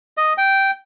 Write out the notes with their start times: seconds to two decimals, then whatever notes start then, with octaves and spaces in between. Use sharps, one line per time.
0.17 D#5
0.38 G5